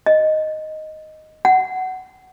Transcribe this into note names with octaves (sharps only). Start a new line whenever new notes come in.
D#5
F#5